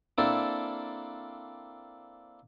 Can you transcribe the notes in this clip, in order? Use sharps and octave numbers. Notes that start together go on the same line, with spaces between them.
A#3 C4 D4 E4 A4